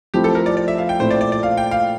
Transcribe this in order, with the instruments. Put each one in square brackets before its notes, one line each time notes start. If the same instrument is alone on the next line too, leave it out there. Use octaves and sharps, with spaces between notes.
[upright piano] F3 A3 C4 E4 [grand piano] G4
[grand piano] A4
A#4
D5
D5
E5
F5
G5
[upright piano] A#2 A3 C4 E4 [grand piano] C5
[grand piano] D5
D5
D5
F5
G5
F5